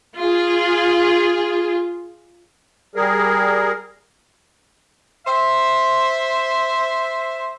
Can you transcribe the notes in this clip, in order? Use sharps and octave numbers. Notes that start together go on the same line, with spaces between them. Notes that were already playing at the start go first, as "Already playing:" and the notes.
F4 G#4
G3 G#4 A#4
C5 E5